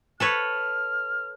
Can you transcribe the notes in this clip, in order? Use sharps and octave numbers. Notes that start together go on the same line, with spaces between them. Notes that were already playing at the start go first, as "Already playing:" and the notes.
A4 B4 C#5 F6